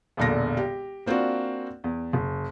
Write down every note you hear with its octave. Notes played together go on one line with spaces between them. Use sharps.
E1 B1 A#2 D3 A#6
G4
A#3 C4 D4 F4 F#4
E2
F#1